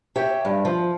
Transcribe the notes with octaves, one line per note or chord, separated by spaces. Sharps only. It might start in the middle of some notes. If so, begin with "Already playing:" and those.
G4 C#5 E5
G2
F3